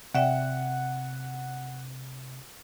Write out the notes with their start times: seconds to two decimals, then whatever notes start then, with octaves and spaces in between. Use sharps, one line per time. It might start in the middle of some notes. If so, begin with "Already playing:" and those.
0.14 C3 D5 E5 F#5 G5